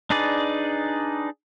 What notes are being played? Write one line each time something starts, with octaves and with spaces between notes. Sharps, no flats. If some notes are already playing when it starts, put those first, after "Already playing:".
D4 D#4 G#4 B4 D5